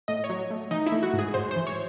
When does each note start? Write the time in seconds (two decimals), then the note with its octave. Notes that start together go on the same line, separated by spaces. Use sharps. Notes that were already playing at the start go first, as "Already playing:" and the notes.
0.08 A2 D#5
0.24 C#5
0.29 F#3
0.50 A3
0.71 E3 D#4
0.86 E4
0.92 A3
1.03 F#4
1.14 G#2
1.19 G#4
1.34 G#2 C5
1.51 C5
1.56 E3
1.67 C#5